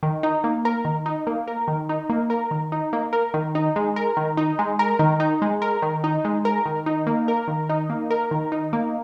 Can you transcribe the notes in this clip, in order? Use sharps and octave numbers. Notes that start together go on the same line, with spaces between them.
D#3
D#4
A#3
A#4
D#3
D#4
A#3
A#4
D#3
D#4
A#3
A#4
D#3
D#4
A#3
A#4
D#3
D#4
G#3
A#4
D#3
D#4
G#3
A#4
D#3
D#4
G#3
A#4
D#3
D#4
G#3
A#4
D#3
D#4
A#3
A#4
D#3
D#4
A#3
A#4
D#3
D#4
A#3